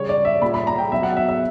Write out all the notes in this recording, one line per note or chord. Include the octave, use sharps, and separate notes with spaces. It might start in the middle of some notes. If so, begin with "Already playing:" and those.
Already playing: C#3 G3 C#5
D5
E5
A#2 G3 B5
B5
A#5
G5
B2 F#3 E5
F#5
E5
E5